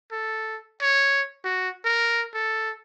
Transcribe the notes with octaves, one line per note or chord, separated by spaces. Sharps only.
A4
C#5
F#4
A#4
A4